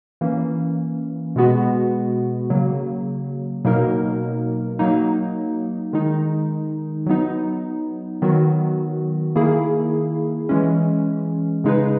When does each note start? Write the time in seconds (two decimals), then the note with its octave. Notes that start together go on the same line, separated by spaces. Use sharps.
0.21 E3 A#3 C#4
1.36 B2 G#3 B3 F#4
2.50 C#3 F#3 A#3
3.65 B2 F#3 A#3 D#4 A#4
4.79 F#3 A#3 D#4
5.93 D#3 G#3 D#4
7.06 F#3 B3 D#4
8.22 D#3 F#3 B3 F#4
9.36 D#3 A#3 E4 G#4
10.49 E3 G#3 C#4
11.64 C#3 G#3 D#4 G#4 B4